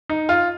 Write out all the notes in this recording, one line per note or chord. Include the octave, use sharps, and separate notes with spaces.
D#4
F4